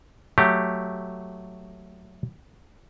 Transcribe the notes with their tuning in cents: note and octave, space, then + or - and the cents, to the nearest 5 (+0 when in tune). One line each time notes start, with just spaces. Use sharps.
F#3 +0 A3 +0 G4 +0